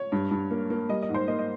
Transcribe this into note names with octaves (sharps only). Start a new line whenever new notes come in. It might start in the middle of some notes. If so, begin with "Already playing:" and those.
Already playing: C#5
G2
G2
A#3
A#3
G3 D#5
D#5
G#2
C5
A#3 D#5
D#5